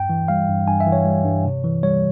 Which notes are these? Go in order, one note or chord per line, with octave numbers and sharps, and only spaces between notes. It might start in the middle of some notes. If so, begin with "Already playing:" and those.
Already playing: G2 G5
E3
G3 F5
G2
G2 G#5
E5
E3
C#5
G3
G2
C3
E3
G3 C#5